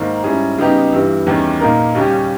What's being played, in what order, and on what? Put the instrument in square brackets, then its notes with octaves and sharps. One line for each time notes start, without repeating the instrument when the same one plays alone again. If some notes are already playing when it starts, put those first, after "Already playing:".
Already playing: [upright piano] G#2 D#3 A#3
G#2 G3 C#4 E4 G#4
C#3 G3 B3 D#4 G4
G2 E3 G3
E2 D#3 G3 C#4 G4
A#2 A#3 D#4 A#4
D#2 C#3 G3 C#4 G4